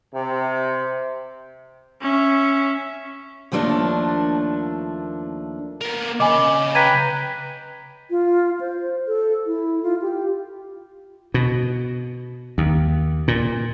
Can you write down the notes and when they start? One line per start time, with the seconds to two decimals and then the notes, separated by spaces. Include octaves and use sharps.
0.14 C3
2.01 C#4 E5
3.52 D#2 F3 A3 A#3 D4
5.81 B3 A#4
6.20 C#3 D#5 G#5 B5 D6
6.75 B4 G5 A#5 G#6 B6 D#7
8.10 F4
8.60 C5
9.07 A4
9.46 E4
9.83 F4
10.02 G4
11.34 B2
12.58 D#2
13.28 A#2